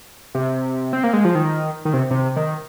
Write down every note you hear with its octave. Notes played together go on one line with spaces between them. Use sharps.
C3
C4
A#3
G#3
F3
D#3
D#3
C3
C3
D#3